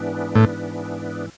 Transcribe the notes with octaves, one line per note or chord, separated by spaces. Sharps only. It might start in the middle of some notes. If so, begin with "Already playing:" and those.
Already playing: G#2 E3 B3 D4
A2